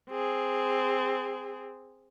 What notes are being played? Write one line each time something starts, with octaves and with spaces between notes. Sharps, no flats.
C4 G#4